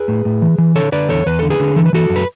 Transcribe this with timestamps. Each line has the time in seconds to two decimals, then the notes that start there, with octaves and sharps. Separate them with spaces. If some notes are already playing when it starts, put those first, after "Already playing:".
Already playing: G#4 B4
0.08 A2
0.25 A2
0.42 E3
0.58 E3
0.75 D3 A4 C#5
0.92 D3 B4 D5
1.09 E2 A4 C#5
1.26 E2 B4
1.39 D3 A4
1.50 G#4 B4
1.60 D3
1.76 E3 A4
1.86 B4
1.93 E3 F#4 A4
2.10 F#2
2.16 B4